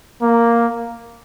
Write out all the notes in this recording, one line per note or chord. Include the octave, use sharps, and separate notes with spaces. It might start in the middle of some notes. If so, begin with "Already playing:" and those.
A#3